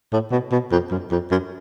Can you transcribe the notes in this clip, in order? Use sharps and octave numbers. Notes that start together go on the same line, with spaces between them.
A2
B2
B2
F2
F#2
F2
F#2